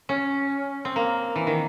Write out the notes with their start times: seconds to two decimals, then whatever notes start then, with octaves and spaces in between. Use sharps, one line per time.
0.09 C#4
0.85 C4
0.96 A#3
1.36 E3
1.47 D#3